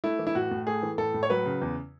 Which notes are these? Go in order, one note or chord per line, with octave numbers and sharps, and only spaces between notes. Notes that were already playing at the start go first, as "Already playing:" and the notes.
A3 E4
E3
E4
A2 F#4
A2
A3 G#4
E3
A2 A4
A2
C#5
F#3 B4
C#3
E2